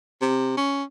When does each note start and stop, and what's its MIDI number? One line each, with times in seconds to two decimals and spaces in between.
0.21 0.54 48
0.57 0.83 61